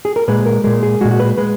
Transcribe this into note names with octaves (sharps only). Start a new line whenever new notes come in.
G#4
A#4
A#2 G#3 B4
A#4
A#2 G#3 A#4
G#4
A#2 G#3 F#4
F#4
B4
G#3 B4